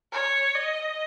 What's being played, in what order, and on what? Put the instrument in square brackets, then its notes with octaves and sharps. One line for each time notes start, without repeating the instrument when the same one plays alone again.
[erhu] C#5
D#5